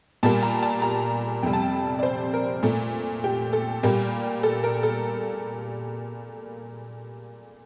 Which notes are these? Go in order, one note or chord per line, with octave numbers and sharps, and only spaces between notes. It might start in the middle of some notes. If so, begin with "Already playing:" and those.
A#2 G3 A#3 A5
A#5
A5
A#5
F2 C3 G3 G5
A5
G5
D5
C5
A#4
A#2 A3
G4
A4
A#2 G3 A#3 G4
A4
A#4
A4